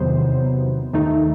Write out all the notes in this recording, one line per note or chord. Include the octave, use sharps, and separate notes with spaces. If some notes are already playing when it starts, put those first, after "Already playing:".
Already playing: E2 C3 D#3 F#3 B3 C5
D#2 D#3 A3 D#4